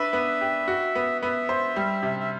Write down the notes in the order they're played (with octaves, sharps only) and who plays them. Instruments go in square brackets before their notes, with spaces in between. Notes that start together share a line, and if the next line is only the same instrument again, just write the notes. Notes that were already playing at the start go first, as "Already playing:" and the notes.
Already playing: [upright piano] D4 B4 [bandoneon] E5
[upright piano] B3
G4
F#4
B3
[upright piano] B3 [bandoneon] E5
[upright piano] C5
G3
C3
[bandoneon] E5